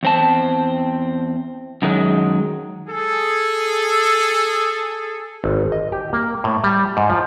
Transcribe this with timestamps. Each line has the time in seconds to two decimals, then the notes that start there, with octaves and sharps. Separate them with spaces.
0.03 E2 C4 A5
1.82 F#2 D#3 F#3 G#3
2.87 G#4 A4
5.44 G#1
5.72 D#5
5.92 G4
6.13 A#3
6.44 A2
6.64 G3
6.97 G#2
7.10 F3